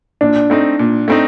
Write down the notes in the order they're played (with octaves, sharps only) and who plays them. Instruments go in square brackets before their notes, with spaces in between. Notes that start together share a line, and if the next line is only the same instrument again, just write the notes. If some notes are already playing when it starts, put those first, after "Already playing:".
[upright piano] A#2 [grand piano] D4
[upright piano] A3 C4 D#4
A#2
A3 C4 D#4